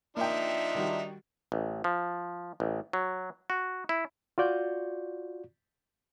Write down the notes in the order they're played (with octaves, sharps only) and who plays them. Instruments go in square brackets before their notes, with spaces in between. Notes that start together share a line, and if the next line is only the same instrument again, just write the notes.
[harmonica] F3 D4 D#4 [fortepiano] A#3 G5 [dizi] E5
[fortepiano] D#3 G3 F#4
[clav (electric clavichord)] A1
F3
A1
F#3
F#4
E4
[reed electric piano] F4 F#4 D5 G6